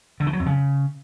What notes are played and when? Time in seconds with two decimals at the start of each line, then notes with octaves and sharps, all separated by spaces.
0.20 D3
0.27 D#3
0.33 F#3
0.40 F2
0.46 C#3